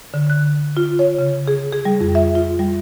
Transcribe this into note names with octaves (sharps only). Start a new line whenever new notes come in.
D3
F#6
F4
C#5
C#3
G#4
G#4
G3
F2
E5
F4
G3